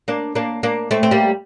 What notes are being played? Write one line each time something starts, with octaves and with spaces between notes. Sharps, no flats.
A#3 D4
A#3 D4
A#3 D4
A3 C4
C4
G3 A#3